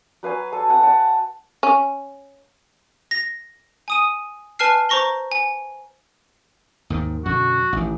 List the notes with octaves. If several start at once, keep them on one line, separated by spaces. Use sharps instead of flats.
F#3 B4 F5 G#5
A4 F5
F#5 G#5
F#5 A5
C#4
A#6
G#5 D#6 D#7
B4 G#5 A5 F6 C7
C5 A#5 C#6 A#6 G7
G#5
D#2 G#2 D#3
F#2 B2 D3 F#4
A1 D#3